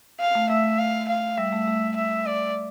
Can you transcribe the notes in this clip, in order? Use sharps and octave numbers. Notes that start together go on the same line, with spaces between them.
F5
A3
A3 E5
A3
F5
F5
G3 E5
A3
A3
E5
D5